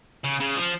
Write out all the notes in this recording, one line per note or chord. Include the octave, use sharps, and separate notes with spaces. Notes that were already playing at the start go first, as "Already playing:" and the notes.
C#3
C#3
F3